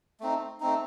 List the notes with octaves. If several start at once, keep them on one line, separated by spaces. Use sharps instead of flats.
A3 C4 D#4
A3 C4 D#4